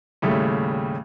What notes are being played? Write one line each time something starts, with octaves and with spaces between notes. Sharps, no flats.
D#2 A2 C#3 G3 A3